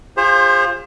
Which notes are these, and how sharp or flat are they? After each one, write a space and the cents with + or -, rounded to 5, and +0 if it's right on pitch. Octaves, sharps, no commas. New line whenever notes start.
F4 +0 G#4 -40 C5 +25